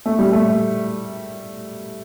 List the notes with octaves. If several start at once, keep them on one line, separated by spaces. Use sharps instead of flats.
A3
G3
A3